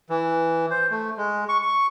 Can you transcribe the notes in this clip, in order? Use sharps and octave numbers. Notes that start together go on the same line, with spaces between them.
E3
C5
A3
G#3
C#6
C#6